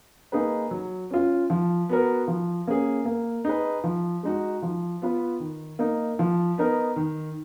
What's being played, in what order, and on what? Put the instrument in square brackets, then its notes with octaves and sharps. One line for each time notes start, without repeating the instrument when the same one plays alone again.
[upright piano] A#3 D#4 G#4 B4
F#3
C#4 F4
F3
B3 F#4 A#4
F3
A#3 C#4 G#4
A#3
D#4 G#4 B4
F3
G#3 D#4 F#4
F3
B3 F4 B4
D#3
A#3 D#4
F3
B3 D#4 A#4
D#3